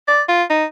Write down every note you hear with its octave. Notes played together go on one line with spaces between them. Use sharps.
D5
F4
D#4